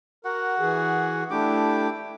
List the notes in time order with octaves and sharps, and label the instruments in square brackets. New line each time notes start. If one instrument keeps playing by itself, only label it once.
[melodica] F#4 F#5 [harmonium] A#4
[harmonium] E3 G#4
[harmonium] A3 D4 E4 [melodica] G4 D6